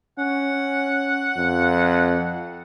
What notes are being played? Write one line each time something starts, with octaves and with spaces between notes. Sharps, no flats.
C#4 F#5
F2